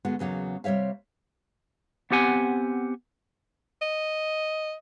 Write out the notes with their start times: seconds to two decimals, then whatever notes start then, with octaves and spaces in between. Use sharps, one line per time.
0.05 D3 G#3 B3 F#4
0.19 E2 C#3 F#3 A#3
0.64 C3 G3 C#5 E5 F5
2.11 B3 C4 G4 F#5 G#5
3.82 D#5